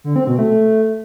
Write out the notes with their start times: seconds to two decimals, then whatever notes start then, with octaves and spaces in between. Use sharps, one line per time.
0.04 D3
0.16 C4
0.27 B2
0.39 A3